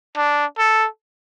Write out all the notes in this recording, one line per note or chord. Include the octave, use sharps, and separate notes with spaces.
D4
A4